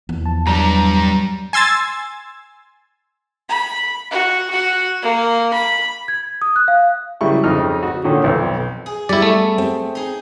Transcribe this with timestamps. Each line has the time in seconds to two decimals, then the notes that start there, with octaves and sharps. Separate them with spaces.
0.09 E2
0.24 F3 A5
0.47 G2 F#3 G3 A#5
1.53 G#5 C6 E6 G#6 A6
3.49 B5
4.11 F#4
4.50 F#4
5.02 A#3
5.53 B5
6.08 G#6
6.42 D#6
6.56 F#6
6.68 F5
7.21 C#3 F#3 G3 E4 C#6
7.44 F2 C#3 D#4 F6
7.83 F#4
8.04 A#2 D3 D#3 C#4
8.24 B1 F2
8.86 G#4
9.09 G3 B3 E4 D5
9.22 A3
9.58 C4
9.95 D#4 G#4